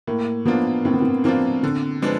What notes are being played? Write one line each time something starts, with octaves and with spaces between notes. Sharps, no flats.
A2 A#3
F3 A#3 B3 D4 F4
A2 C4
B3
C4
F3 A#3 C4 D4 F4
D3 C4
F3 G#3 B3 D4